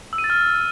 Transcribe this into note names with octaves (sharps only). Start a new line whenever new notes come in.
E6
D#7
A6
F6